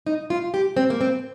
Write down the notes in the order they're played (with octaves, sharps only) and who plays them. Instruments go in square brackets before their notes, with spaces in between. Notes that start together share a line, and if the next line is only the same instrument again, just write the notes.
[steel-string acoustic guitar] D#4
F4
G4
C4
A#3
C4